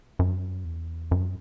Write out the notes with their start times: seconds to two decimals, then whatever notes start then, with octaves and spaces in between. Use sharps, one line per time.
0.19 F#2
0.65 E2
1.11 F#2